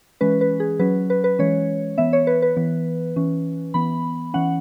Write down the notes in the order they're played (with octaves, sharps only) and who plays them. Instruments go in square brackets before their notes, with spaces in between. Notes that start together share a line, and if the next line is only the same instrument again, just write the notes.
[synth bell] E3 G#3 C#4 B4
B4
G#4
F#3 C#4 B4
B4
B4
E3 G#3 C#4 C#5
E3 B3 E5
C#5
B4
B4
E3 B3
E3 C#4
E3 B3 B5
E3 C#4 F#5